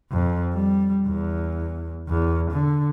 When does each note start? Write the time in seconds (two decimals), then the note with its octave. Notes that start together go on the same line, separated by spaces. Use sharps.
0.12 F2
0.55 G3
1.07 E2
2.09 E2
2.51 D3